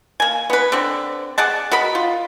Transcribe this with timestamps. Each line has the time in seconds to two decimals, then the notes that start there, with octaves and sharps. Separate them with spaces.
0.20 A#3 G#5
0.50 B3 B4
0.72 D3 C4
1.38 G#4 D5 F#5 A5
1.71 F#4 A#4 D#5 B5
1.95 F4